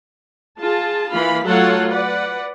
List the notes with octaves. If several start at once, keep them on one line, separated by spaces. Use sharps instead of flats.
F4 G#4 A5
E3 A#3 F4 F5 B5
F#3 A3 F4 A4 C#5 F#5
B4 D5 F#5